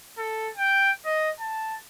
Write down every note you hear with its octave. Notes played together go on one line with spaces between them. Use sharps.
A4
G5
D#5
A5